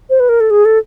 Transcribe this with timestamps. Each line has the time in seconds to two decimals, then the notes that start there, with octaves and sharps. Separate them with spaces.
0.10 C5
0.20 B4
0.29 A#4
0.40 A4
0.51 G#4
0.65 A4